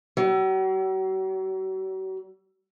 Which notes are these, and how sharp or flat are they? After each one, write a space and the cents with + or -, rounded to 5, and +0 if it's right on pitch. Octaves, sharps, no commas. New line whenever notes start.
F#3 +40